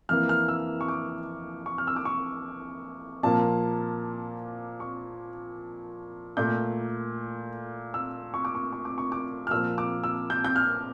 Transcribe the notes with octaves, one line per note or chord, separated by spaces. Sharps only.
F2 E3 A#3 F6
F6
E6
C#6
D6
C#6
F6
E6
D6
C#6
A#2 F3 A#3 A5
C#6
A#2 A3 G6
E6
C#6
D6
C#6
C#6
D6
C#6
D6
F6
A#2 F3 A#3 E6
D6
E6
G6
G6
F6